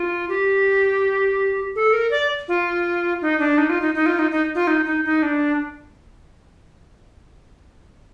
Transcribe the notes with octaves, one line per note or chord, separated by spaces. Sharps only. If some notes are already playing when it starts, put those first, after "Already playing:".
Already playing: F4
G4
A4
A#4
D5
F4
D#4
D4
D#4
F4
D#4
D#4
F4
D#4
D#4
F4
D#4
D#4
D#4
D4